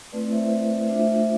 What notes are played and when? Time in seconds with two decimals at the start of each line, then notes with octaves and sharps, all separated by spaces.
0.12 A3 C4 E4 B4 D5
0.32 C5 E5
0.89 A3 D4 F4 C5 E5